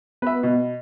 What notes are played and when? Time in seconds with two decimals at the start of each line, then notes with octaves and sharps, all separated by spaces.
0.22 B3 B4 E5
0.43 B2